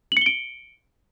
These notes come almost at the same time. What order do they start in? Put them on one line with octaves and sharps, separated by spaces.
F#7 C#7 G7 D7